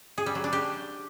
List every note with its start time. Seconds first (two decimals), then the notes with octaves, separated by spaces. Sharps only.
0.18 G#4
0.26 G3
0.35 F#3
0.44 D4
0.53 G4